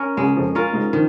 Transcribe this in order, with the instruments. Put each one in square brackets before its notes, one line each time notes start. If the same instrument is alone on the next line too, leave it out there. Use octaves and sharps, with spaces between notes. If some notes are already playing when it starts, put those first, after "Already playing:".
Already playing: [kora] C#4 A#4
[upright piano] C#2 C#3 [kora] G#3
[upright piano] F2 F3
[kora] C#4 F4 A#4
[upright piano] G#2 G#3
[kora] D#3 [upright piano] F3